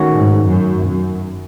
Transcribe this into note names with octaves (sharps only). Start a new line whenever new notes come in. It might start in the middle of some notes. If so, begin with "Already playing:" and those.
Already playing: D#3 A3 C#4 F#4
G#2
F#2
F#2